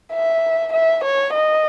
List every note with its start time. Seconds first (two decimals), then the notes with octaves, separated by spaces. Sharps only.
0.13 E5
0.73 E5
1.04 C#5
1.34 D#5